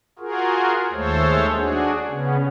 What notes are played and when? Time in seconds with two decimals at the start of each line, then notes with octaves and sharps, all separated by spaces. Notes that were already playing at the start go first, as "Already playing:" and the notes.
0.19 F4 F#4 G#4 A#4
0.91 D#2 G#3 A3 A4 C5 C#5
1.53 D4 F#4 G#4
2.07 C#3 B3 C#4